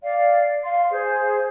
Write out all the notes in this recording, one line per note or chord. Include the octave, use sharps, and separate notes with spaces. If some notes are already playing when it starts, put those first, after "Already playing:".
D5 F5
F5 C6
G#4 C5